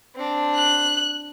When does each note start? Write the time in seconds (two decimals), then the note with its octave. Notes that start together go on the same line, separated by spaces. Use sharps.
0.15 C4 D4
0.55 F#6